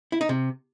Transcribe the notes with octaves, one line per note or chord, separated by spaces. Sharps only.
E4
D#4
C3